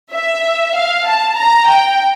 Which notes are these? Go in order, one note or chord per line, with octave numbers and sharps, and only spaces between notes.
E5
F5
A5
A#5
G5